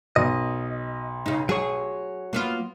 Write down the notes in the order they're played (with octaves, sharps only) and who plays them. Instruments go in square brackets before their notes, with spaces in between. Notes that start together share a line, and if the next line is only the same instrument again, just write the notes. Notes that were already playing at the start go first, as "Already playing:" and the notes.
[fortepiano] B1 [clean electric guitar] D#5
[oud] C#3 D#4
[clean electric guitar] F#3 C#5 [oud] G#4
[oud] A#3 B3 F4